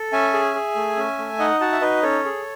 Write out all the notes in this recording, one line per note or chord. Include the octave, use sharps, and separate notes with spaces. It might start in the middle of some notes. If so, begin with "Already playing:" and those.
Already playing: A4
C#4 E5 G#5
G#4
G#4
A3
C#4
A3
D#4 D#5 F#5
F#4 F#5 A5
E5
D#4 B4 D#5
C#4 A4 C#5
G#4